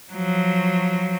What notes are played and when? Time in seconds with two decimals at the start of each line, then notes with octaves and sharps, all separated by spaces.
0.13 F3 F#3